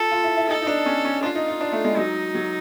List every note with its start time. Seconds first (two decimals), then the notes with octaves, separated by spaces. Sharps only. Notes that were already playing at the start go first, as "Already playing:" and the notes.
Already playing: F4 A4
0.11 F4
0.24 E4
0.37 E4
0.48 D#4 A4
0.62 D#4
0.67 D4
0.86 C#4
1.05 C#4
1.23 D4 F4
1.35 D#4
1.48 D#4
1.61 D4
1.72 A3
1.85 G#3
1.97 F#3 D#4
2.35 F#3